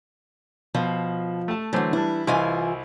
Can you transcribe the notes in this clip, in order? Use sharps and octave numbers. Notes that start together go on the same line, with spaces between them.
B2 F3
A3 A5
D3 E3 F#3 A3 C5
E3 G3 D4 E4
C2 E3 E4 F4 D#5 G#5